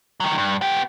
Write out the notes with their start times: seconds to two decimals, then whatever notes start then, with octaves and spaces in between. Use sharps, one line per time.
0.20 D#3 F#3
0.38 G2
0.61 B3 G4